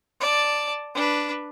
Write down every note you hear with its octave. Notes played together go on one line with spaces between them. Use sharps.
D5 A5
D4 B4